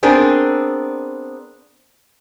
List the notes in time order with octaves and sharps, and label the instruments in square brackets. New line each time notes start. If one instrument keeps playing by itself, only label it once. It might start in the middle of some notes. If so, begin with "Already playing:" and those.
[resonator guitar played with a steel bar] B3 C4 D4 G#4 A#4